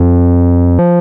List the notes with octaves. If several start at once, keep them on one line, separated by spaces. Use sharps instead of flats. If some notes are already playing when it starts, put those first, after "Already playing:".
Already playing: F2
F3